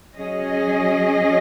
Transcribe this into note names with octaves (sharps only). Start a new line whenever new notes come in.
F#3 C#4 G#4 D#5